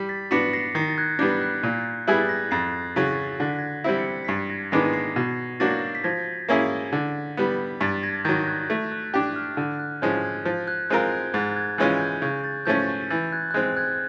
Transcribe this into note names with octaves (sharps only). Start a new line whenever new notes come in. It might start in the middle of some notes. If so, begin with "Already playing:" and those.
Already playing: G3
A6 B6
B3 D4 F#4 B6 C#7
A#6 C7
D#3 A#6 C7
A6
F#6 G#6
G3 B3 D4 G6
F#6
A#2 F#6
G3 B3 E4 G#4 F#6 G#6
A6
G#6 A#6
F2 A#6 C7
C#3 F#3 A6 B6
D3 A#6
B6
G#6 A#6
G3 C4 E4
B6 C#7
B6
G2 A#6 C7
G#6 A#6
D#3 G#3 B3 D4 A#6 C7
A#6 C7
B2 G#6 A#6
F#3 A#3 D4 F#4 G6 A6
B6
F3 G#6 A#6
A#3 C#4 E4 G#4
D3
G3 B3
G2 A6 B6
A6
G#6 A#6
D#3 F#3 G6 A6
F#6 G#6
A3 G6
F#6
D4 G4 F#6
F6
D3
F#6
F#6
F3 G#3 C#4 G6
F#6 G#6
F3 G6 A6
F#6 G#6
G#3 C4 F4 A#4 G6
F#6 G#6
G#2 G6 A6
F#6 G#6
E3 G#3 C#4 F4 G6
G#6
G6
C#3 G6
G6 A6
F3 A3 C#4 G6 A6
E3 G6 A6
F#6 G#6
F#6
G#3 C4 G6
F#6 G#6